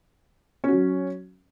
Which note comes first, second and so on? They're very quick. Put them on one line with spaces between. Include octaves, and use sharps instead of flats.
C#4 F#4 F#3